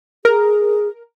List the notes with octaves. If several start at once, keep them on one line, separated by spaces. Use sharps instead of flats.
G#4 A#4